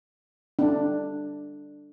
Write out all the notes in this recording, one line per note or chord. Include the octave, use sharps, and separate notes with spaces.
D4